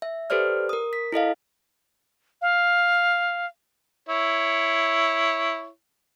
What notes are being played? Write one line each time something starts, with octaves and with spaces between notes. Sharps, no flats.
E5
G4 A4 B4 C5 D5 F6
A#4 D#6
B6
E4 A4 D#5 F5
F5
E4 C#5